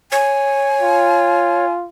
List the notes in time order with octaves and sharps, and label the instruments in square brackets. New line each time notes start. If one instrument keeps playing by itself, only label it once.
[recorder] C#5 [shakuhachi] G#5
[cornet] F4